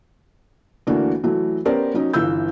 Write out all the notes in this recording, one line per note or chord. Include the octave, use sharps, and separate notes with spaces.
D2 E3 A#3 D4 F#4
E3 F#3 A3
B3 C#4 G4 A#4 C5 D5
F#3 C#4 D#4
G1 E3 F4 E6 G6